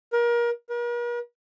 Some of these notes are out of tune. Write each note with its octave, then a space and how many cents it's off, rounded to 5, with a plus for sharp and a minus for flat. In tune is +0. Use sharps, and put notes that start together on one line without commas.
A#4 +30
A#4 +45